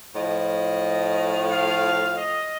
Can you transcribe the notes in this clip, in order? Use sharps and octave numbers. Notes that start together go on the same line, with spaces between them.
A2 F3 D#5
F5
D#5